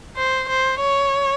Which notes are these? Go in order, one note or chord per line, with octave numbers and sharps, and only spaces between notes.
C5
C5
C#5